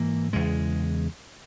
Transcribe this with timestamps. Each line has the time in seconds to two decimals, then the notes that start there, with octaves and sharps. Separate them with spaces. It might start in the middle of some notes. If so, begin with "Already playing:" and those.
Already playing: G#2 E3 A#3
0.33 E2 C#3 G#3